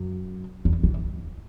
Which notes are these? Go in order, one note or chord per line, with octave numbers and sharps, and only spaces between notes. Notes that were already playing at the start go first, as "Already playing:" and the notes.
Already playing: F#2
E2
E3